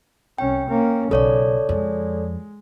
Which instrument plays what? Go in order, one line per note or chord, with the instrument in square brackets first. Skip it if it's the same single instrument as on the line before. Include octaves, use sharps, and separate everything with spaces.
[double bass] C2 C#4 [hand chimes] G5
[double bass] A#3 C#4
[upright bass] B1 [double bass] C#3 [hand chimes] A4 C#5 D5
[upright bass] F2 [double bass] G#3